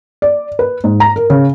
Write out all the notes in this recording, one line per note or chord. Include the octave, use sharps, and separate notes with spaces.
D5
B4
G#2
A#5
A#4
C#3